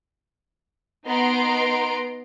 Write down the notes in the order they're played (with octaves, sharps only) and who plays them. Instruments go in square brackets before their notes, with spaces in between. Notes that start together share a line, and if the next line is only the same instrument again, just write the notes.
[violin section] B3 D#4 A#5 C6 D7